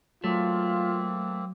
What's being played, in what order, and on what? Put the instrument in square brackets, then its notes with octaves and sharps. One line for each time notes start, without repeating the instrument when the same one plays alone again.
[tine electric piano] F#3 [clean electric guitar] A3 [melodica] A#3 C4 [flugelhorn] F4